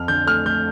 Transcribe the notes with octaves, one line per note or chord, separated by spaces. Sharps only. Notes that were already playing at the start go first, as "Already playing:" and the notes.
Already playing: F2 F6
D3 G6
A3 F6
A3 G6